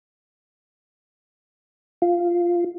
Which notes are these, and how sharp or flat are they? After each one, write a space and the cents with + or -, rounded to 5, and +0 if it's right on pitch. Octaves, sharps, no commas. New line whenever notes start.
F4 -5